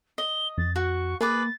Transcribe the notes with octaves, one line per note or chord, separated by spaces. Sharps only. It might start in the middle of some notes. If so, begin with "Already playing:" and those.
D#5 G7
F2 A6
F#4 C#6
A#3 G#4 B4 D6 A6